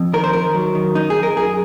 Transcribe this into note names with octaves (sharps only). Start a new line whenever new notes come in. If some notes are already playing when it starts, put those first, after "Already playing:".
Already playing: F2
D#3 A#4
C5
D#3 A#4
F#3
D#3
F#2 D#4
G#4
F#2
A#4
F#2 G#4